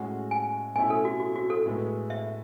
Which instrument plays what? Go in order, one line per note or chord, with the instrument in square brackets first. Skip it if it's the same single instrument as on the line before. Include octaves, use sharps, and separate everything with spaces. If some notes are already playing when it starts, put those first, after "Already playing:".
Already playing: [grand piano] A2 G#3 C#4 F#4 [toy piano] F#5
[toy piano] G#5
[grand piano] B2 A3 C#4 E4 [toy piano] G#5
[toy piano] A4
F#4
F#4
F#4
A4
[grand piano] A2 G#3 B3
[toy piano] E5